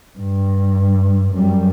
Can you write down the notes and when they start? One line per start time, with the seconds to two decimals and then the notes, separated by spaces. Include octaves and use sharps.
0.19 G2
1.34 F#2 G3